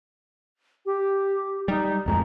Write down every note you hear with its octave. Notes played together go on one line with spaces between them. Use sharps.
G4
G3 D#4
D1 F2 G#3 A#5